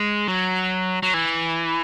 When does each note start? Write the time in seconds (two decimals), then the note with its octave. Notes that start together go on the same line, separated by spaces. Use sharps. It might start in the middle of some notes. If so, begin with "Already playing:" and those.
Already playing: G#3
0.28 F#3
1.03 F#3
1.14 E3